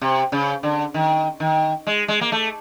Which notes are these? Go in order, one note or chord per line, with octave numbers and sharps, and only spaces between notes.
C3
C#3
D3
D#3
D#3
G#3
G#3
A#3
A3